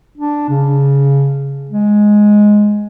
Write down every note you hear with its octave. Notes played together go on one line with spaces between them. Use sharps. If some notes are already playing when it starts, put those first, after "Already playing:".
D4
C#3
G#3